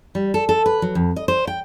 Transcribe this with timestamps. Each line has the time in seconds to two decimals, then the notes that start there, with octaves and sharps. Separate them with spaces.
0.15 G3
0.34 A4
0.49 A4
0.66 B4
0.82 F#3
0.95 F2
1.16 D#5
1.28 C5
1.47 G5